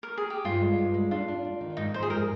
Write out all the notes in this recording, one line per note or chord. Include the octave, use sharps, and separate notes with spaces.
A#4
G#4
G4
G2 F4
G#3
G2
G#3
D4 F4
D4
D4
D#3
G#2 D#4
F3 C5
G#4
G#2 A#4